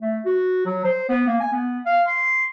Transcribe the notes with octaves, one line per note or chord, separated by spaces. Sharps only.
A3
F#4
F#3
C5
B3
A#3
G#5
B3
F5
C6